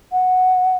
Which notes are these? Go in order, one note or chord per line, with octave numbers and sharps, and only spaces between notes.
F#5